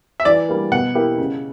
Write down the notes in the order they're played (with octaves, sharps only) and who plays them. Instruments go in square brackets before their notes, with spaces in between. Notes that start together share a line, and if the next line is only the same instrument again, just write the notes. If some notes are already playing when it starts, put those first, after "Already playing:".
[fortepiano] E5
[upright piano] E3 [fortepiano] D5
[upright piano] G3 A#3
[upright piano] B2 [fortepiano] F#5
[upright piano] A#3 E4 G4
C#3